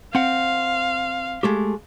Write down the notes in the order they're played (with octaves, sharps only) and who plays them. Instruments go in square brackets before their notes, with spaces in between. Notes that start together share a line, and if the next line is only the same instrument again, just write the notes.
[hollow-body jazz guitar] C4 F#5 [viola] F5
[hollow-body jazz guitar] G#3 A3 G4